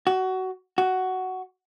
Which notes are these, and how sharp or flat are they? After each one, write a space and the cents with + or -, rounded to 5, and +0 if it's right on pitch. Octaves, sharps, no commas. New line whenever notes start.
F#4 +20
F#4 +10